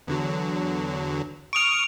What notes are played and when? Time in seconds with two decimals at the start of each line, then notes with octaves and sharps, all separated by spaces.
0.07 E2 D3 F#3
1.53 C#6 D#6 F6 D7 F7